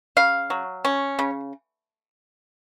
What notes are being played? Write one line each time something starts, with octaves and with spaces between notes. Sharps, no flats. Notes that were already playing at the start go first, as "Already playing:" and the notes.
C#3 F5
F#3
C#4
C#3